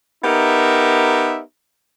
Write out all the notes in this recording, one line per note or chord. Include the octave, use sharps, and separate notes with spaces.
B3 D#4 G4 A#4 E5